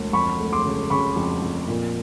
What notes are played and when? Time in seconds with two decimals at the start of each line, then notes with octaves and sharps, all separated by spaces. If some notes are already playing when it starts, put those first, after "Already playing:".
Already playing: E1 D2
0.13 F2 B5 C#6
0.40 A3
0.53 C6 D6
0.64 C#3
0.90 C#3 B5 C#6
1.16 F2
1.42 F2
1.68 A#2